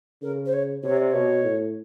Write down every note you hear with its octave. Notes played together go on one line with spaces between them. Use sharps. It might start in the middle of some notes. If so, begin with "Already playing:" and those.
C#3 A#4
C5
C#5
C3 C#5
D5
B2 C#5
A2